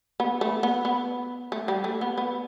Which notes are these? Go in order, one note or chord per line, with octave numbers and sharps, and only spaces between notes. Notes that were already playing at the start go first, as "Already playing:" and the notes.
B3
A3
B3
B3
A3
G3
A3
B3
B3